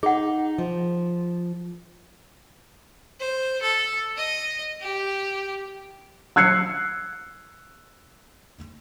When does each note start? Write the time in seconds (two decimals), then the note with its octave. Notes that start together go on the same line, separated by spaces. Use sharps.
0.03 D#4 G#4 F#5
0.58 F3
3.20 C5
3.62 A4
4.17 D#5
4.81 G4
6.36 E6 F#6 G#6 C7 C#7